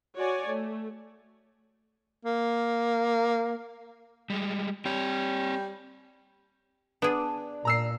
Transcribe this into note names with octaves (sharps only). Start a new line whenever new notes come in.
F#4 C#5 D5 G#5
A3
A#3
G3 G#3
G3 C4 C#5
B3 D4 G#4
A#2 A#5 E6 C7